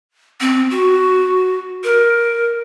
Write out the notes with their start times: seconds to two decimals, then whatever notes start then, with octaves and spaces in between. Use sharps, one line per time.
0.40 C4
0.71 F#4
1.84 A#4